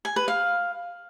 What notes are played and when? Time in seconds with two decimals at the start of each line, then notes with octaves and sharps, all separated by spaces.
0.05 G#5
0.16 B4
0.28 F5